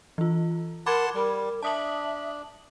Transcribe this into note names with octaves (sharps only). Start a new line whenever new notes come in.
E3 F4
A#4 F#5 A5 B5 C6 D6 G#6
G3 A#4
D4 E5 A5 D#6 F#7